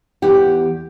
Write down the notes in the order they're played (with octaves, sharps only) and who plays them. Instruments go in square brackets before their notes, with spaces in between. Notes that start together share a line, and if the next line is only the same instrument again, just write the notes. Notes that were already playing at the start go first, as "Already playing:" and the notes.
[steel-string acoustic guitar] E2 G4 F#5